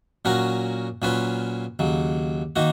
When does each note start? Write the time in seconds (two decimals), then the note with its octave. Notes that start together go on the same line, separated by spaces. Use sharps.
0.25 A#2 F#3 C#4 F#4 A#4
1.02 A#2 F#3 C#4 F4 B4
1.79 D#2 C#3 F#3
2.56 D#3 A#3 D#4 F#4